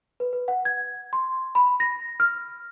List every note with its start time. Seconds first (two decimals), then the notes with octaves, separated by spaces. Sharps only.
0.20 B4
0.33 B4
0.48 F#5
0.65 G#6
1.13 C6
1.55 B5
1.80 A#6
2.20 F6